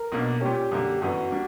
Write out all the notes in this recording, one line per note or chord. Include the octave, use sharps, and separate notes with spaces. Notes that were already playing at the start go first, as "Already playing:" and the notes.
Already playing: A#4
B1 B2 A#3 D4
A#2 G3 C#4 G4
F#2 D3 G3 A#3
G1 F#2 E3 F#4
G3 A#3 D4